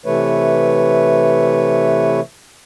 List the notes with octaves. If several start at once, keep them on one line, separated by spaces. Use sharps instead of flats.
C3 E3 A3 B4 C#5